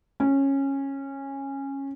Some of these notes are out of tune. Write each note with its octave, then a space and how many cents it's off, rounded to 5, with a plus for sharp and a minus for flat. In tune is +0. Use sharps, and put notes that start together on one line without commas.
C#4 -15